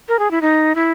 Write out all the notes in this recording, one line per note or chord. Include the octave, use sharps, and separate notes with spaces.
A#4
G#4
E4
D#4
E4